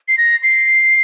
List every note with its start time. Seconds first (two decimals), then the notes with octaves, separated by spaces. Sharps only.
0.08 C7
0.18 A#6
0.43 C7